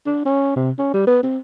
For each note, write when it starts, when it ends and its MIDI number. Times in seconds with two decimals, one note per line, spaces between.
0.06 0.24 62
0.25 0.52 61
0.56 0.71 48
0.79 0.93 61
0.94 1.07 55
1.07 1.19 59
1.23 1.38 60